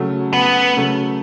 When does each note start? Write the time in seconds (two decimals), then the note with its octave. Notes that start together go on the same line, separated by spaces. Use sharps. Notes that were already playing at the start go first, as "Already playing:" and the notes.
Already playing: C#3 F#3 A3
0.33 B3
0.77 C#3 F#3 A3